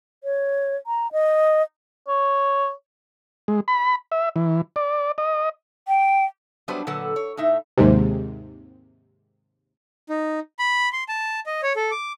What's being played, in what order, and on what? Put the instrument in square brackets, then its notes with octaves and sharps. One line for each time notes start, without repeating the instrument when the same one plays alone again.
[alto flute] C#5
A#5
D#5
[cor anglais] C#5
[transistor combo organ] G#3
B5
E5
E3
D5
D#5
[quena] G5
[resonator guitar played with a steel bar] F#3 G3 B3 D4 B4 C5
A#2 D3 F#3 A4 B4 F#5
C#5
A2 D#4 E5
[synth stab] D#2 G#2 C3
[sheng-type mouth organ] D#4
B5
C6
A5
D#5
C#5
A4
D6